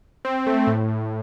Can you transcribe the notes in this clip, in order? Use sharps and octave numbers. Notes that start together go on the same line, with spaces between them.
C4
A3
A2
A2